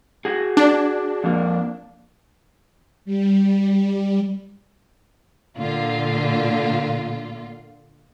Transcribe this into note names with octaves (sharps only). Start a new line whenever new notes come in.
F#4 G#4
D4
F2 A#3
G3
A#2 D3 F4